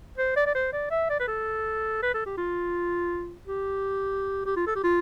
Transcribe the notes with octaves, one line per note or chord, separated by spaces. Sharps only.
C5
D5
D5
C5
D5
E5
D5
B4
A4
B4
A4
G4
F4
G4
G4
F4
A4
G4
F4